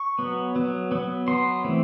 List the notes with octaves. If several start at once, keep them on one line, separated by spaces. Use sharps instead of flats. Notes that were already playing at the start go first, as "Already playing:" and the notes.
Already playing: C#6
F#3 B3
F#3 B3
F#3 B3
F#3 B3 C6
E3 A3 C4